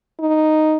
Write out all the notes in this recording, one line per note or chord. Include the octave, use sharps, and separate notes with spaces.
D#4